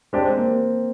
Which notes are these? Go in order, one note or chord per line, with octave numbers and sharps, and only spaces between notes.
G#3 C4 D4 G4 D5
C4
A#3